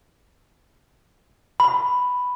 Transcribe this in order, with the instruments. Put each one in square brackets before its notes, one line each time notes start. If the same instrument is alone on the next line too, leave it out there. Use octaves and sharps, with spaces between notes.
[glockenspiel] B5